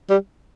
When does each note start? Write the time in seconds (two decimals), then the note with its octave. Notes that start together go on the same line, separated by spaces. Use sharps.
0.10 G3